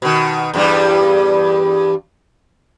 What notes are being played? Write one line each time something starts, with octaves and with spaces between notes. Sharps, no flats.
B2 D#3
E2 G2 G3